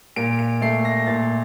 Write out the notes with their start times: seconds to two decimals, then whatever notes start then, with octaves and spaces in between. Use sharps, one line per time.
0.16 A#2 D7
0.39 D7
0.61 A3 C7
0.85 A#6
1.07 A#2 A6